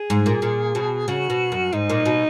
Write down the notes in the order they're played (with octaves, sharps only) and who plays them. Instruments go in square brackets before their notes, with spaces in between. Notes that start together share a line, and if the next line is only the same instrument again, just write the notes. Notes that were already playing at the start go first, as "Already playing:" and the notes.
Already playing: [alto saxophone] G#4
[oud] G#2
A#2
A#2
B2
[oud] C#3 [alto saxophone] F#4
[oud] B2
F#2
[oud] G#2 [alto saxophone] D#4
[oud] A#2
B2